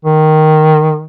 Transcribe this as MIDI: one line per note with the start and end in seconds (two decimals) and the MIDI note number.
0.05 1.04 51